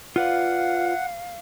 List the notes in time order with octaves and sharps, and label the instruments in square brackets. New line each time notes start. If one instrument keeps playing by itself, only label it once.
[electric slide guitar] F4 B4 D5 [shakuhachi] F5 [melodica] F#5